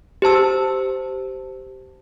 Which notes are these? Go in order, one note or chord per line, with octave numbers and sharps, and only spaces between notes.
G4 C5 A5 E6